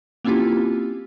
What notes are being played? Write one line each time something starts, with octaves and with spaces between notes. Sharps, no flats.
A#3 C4 C#4 E4 F4 G4